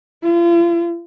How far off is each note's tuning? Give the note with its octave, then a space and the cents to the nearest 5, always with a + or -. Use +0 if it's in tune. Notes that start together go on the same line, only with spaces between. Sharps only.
F4 -40